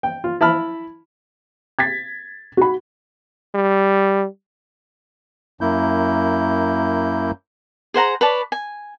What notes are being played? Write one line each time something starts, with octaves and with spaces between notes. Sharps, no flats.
G5
F4
E4 A5 B5 F6
G#6 A6 B6
F#4 B5
G3
F#2 A#3 E4 G6
G#4 C5 F#5 A#5
B4 C#5 D5 A5
G#5